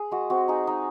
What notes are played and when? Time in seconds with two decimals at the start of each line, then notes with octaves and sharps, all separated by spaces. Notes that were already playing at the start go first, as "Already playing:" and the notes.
Already playing: G#4
0.11 G#3 F#4
0.30 C4 F#4
0.48 D#4 G#4
0.67 D#4